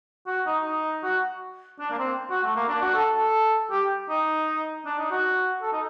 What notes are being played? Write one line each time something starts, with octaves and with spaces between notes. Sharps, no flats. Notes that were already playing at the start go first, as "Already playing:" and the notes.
F#4
D#4
D#4
F#4
D4
A#3
C4
F#4
A3
A#3
D4
F#4
A4
A4
G4
D#4
D4
D#4
F#4
A4
D#4